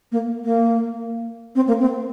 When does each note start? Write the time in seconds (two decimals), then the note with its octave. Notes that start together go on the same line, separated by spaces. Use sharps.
0.12 A#3
0.44 A#3
1.55 C4
1.68 A#3
1.80 C4